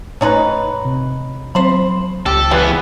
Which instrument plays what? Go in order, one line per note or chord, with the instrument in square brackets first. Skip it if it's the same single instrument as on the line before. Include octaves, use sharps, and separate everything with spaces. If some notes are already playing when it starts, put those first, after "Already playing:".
[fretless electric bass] A2 [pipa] C#4 D#4 B4
[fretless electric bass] C3
[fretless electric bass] F#3 C4 [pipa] C5 B5
[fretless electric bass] C#2 [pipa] G4 [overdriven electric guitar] A4
[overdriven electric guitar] E3 B3 [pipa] G3 G#4 B4